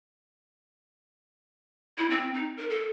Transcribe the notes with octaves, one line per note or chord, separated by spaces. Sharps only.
E4
C4
D#4
A#4
A4